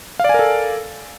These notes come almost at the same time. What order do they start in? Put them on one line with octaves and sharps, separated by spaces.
F5 D5 G#5 A#4 A4